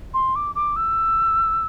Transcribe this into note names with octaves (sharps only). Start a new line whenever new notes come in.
C6
D6
D6
E6